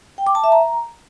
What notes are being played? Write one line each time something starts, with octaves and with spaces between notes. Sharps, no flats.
G5
D6
A5
E5
A#5